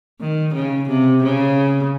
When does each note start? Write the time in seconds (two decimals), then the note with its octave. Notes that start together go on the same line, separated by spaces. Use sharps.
0.20 D#3
0.54 C#3
0.89 C3
1.23 C#3